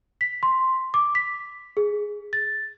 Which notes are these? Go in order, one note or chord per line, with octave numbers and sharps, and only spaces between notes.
B6
C6
D6
B6
G#4
A6